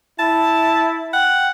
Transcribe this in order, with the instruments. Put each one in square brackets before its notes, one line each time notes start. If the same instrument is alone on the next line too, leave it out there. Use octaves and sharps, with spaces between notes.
[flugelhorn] E4 [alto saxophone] A5
[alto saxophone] F#5 [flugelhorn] G5